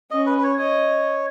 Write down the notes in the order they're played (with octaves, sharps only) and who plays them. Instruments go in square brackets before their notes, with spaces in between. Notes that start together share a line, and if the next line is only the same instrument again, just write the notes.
[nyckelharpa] C#4 [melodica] D#5
[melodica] B4
B4
C#5
[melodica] C#5 [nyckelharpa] D#5